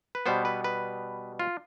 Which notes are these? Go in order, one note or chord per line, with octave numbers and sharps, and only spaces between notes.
B4
B2 G3 B3 C5
B4
B4
F4